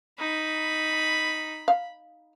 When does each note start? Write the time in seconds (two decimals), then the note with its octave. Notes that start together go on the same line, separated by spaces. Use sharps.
0.19 D#4 B5
1.68 F5